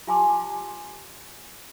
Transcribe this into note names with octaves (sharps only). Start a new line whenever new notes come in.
F4 G4 G#5 A5 C6 D6